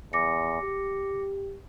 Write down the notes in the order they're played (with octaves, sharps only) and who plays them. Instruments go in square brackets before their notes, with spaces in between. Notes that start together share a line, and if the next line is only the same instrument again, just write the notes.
[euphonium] E2 [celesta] D6 A#6 C#7
[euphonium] G4